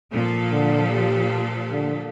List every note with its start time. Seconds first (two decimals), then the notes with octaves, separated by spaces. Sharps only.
0.12 A#2 F3 A4
0.52 D3
0.88 G4
1.71 D3